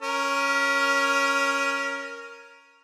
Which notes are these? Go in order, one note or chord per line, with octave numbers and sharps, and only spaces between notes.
C#4 A#4